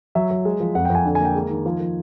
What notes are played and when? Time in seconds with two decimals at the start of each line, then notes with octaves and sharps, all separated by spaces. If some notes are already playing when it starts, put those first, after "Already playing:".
0.15 F#3 E5
0.31 F#3
0.45 G#3
0.60 F3
0.75 F2 F#5
0.85 G5
0.90 F2
0.95 G#5
1.06 D3
1.15 G#5
1.20 A#3 G5
1.35 G#3
1.50 D#3
1.65 F3
1.80 F3